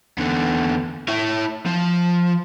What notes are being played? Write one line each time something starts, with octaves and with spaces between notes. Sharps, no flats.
E2 D3
E4 C#5
F3